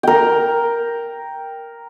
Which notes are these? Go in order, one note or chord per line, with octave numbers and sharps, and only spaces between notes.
A#4 G5